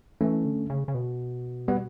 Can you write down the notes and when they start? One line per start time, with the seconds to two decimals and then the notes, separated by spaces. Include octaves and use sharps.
0.21 E3 A3 C#4
0.45 D3
0.70 C#3
0.88 C#3
0.94 B2
1.68 G3 B3